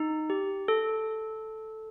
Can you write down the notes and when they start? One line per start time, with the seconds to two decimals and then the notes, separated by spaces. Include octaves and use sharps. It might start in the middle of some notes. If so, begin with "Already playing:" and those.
Already playing: D#4
0.30 G4
0.68 A4